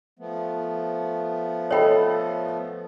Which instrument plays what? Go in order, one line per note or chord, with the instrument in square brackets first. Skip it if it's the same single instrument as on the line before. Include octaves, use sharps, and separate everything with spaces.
[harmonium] F3 A3 B3
[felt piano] A4 D#5 [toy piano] C#5 G5 B5